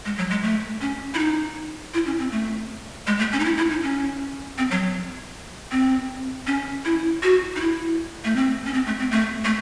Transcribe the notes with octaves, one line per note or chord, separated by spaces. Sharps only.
G#3
F#3
G#3
A3
C#4
E4
D#4
E4
C#4
C4
A3
G#3
A3
C#4
D#4
E4
E4
D#4
C#4
C4
F#3
C4
C#4
E4
F#4
D#4
E4
A3
C4
C#4
C4
A3
C4
A3
A3